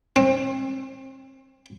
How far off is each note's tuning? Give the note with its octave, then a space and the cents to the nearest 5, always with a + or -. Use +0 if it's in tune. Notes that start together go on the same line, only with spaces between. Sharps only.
C4 +30